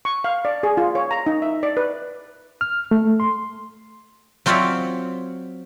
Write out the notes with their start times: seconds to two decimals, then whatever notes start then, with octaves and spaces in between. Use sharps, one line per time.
0.05 C#6
0.24 F5
0.45 D5
0.63 G#4
0.77 F4
0.95 C#5
1.11 A#5
1.27 D#4
1.42 E5
1.63 D5
1.77 B4
2.61 F6
2.91 A3
3.20 C6
4.46 F#3 C4 F4 C#5 D5 E5